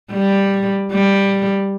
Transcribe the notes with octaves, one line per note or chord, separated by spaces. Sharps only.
G3
G3